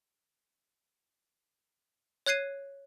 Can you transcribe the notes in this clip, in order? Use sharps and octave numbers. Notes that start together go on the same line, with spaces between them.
C#5 F#6 G#6 C7 D#7